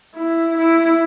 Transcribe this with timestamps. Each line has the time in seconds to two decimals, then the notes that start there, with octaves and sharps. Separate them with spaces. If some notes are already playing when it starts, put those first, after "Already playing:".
0.15 E4
0.58 E4